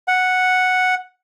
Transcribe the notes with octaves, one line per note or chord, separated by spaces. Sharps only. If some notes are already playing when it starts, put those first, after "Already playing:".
F#5